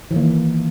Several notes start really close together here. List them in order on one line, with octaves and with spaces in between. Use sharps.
E3 D#3 A#3